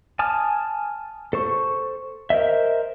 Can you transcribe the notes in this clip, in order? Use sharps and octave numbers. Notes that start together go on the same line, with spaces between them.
G#5 A5 D#6 F6
A4 C5 C#6
A#4 C5 D#5 E5